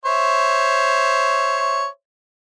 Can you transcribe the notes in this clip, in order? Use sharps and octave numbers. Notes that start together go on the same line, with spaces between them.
C5 C#5 E5